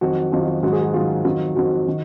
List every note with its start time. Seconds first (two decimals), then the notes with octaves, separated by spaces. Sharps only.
0.01 F2 D#3 F#3 F#4
0.32 F2 D#3 F#3 F4
0.44 F#4
0.63 G#2 D#3 F#3 F#4
0.73 G#4
0.82 F#4
0.94 G#2 D#3 F#3 F4
1.25 F2 D#3 F#3
1.56 F2 D#3 F#3 F#4
1.88 D#3